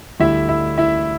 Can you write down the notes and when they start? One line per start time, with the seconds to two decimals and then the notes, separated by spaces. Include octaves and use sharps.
0.20 D2 D3 G3 E4 E5
0.49 E4 E5
0.78 E4 E5